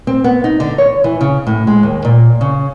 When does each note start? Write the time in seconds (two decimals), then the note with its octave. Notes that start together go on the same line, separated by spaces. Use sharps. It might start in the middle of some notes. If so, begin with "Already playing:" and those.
0.07 C4
0.24 B3
0.44 D#4
0.60 D3
0.78 C#5
1.04 E3
1.21 C#3
1.47 A2
1.67 G#3
1.83 D#2
2.05 A#2
2.41 C#3